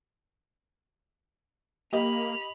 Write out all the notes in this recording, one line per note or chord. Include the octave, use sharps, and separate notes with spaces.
A#3 G4 D#5 B5 F7